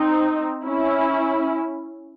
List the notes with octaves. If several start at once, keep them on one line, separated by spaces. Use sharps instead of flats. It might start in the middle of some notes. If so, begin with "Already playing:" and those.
Already playing: C4 D#4
C#4 E4